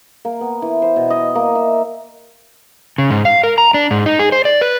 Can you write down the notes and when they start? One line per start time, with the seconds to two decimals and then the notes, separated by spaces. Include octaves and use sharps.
0.25 A#3
0.41 B3
0.62 E3
0.82 C5
0.96 B2
1.10 D#5
1.35 A#3
1.55 E5
2.98 C#3
3.11 G#2
3.25 F5
3.44 A#4
3.58 A#5
3.74 D4
3.91 G#2
4.06 D#4
4.19 G#4
4.32 C5
4.45 D5
4.61 B4